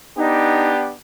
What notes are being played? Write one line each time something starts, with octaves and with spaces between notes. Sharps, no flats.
B3 D4 D#4 G4